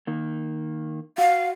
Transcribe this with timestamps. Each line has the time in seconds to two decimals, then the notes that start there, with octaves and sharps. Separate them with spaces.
0.07 D#3 A#3
1.18 F#4 F5